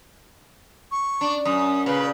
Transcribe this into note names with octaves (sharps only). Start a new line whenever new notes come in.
C#6
D4
F#2 D#6
A#2 C#3 B4